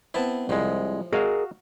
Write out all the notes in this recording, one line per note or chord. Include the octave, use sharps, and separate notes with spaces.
B3 C4 E4 C5 A5
C2 A2 F3 G#3
F#4 G#4 A#4 D#5 F5